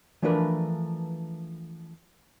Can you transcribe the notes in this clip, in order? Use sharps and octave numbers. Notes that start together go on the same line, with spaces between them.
E3 F3 A3 D4 A#4 B4